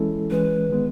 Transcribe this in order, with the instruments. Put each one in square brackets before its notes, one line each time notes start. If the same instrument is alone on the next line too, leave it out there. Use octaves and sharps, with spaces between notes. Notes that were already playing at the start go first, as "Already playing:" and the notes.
Already playing: [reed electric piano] E3 G#3 C#4 E4 A4
[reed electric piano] E3 G#3 C#4 [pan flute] B4
[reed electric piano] D#3 G#3 B3